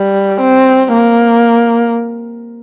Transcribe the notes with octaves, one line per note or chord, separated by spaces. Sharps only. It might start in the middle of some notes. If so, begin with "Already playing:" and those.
Already playing: G3
C4
A#3